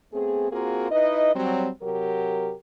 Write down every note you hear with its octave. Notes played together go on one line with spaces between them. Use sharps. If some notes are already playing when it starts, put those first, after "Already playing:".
A3 B3 C4 G#4
A#3 C4 F4 F#4 G#4 A#4
D#4 E4 B4 D#5
F#3 G3 C4
C3 F#3 G4 A#4